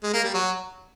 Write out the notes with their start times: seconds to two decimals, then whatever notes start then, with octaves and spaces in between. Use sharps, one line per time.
0.03 G#3
0.13 A#3
0.24 G3
0.34 F#3